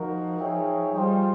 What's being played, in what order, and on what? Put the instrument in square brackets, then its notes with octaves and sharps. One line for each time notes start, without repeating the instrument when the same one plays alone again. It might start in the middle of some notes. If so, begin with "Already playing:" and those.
Already playing: [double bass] F3 [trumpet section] D#4 F#4 A#4
[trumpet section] D#4 G#4 C#5 E5 G5
[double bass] G3 [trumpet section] F4 G#4 C5 D#5 G5